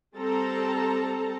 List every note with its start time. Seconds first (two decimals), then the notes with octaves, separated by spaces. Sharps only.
0.16 G3 C4 A4 A5 A#5